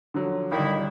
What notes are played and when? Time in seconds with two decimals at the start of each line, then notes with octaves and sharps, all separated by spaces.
0.14 D3 F3 F#3
0.52 G#1 D3 D#3 G3 E4